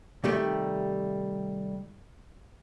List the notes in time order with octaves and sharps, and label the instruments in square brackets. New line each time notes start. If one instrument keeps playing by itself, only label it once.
[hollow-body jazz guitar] C3 D#3 G3 A3 G4